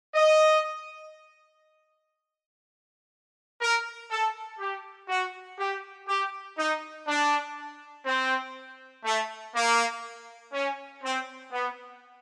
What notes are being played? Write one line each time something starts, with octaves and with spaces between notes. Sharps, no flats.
D#5
A#4
A4
G4
F#4
G4
G4
D#4
D4
C4
A3
A#3
C#4
C4
B3